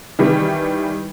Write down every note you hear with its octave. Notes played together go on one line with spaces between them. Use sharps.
D#3 E3 G3